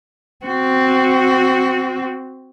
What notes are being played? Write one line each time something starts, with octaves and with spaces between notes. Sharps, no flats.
C4 F#4